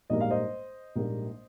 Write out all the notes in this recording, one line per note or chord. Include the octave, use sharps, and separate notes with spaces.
A#1 G#2 G3 A#3 D#5
F5
C5 D#5
A#1 G#2 G3 A#3